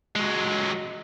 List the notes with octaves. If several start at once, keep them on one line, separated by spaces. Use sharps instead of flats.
F#3 G#3